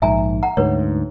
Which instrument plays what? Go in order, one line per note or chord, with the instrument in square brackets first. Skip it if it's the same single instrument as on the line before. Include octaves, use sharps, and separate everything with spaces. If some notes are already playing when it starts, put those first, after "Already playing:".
[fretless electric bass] A#1 G#2 [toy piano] E5 G#5 A#5
[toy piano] F#5 A#5
[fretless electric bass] D2 G#2 [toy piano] B4 C#5